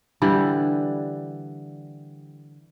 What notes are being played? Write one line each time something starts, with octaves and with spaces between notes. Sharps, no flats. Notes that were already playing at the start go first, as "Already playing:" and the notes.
D3 E3 G3